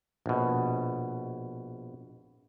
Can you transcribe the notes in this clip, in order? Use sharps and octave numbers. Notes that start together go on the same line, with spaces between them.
A#1 B2